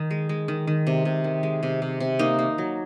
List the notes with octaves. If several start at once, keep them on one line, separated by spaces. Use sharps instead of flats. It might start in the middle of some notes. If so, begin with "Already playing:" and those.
Already playing: D#3 D#4
G#3
G#3
D#3
D#3
C3
C3
D#3
G#3
C3
C3
C3
A#3 D#4
A#3
F#3